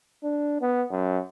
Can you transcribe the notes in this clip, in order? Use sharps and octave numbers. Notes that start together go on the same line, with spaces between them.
D4
B3
F#2